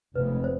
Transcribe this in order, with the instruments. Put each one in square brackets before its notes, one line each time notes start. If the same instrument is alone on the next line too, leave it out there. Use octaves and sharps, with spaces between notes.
[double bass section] F1 F2 C3 G#3 B3 [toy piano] B4
[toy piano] C5